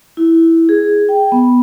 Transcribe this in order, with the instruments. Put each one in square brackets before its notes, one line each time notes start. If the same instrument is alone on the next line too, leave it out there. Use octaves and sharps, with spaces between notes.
[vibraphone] E4
G#4
G5
B3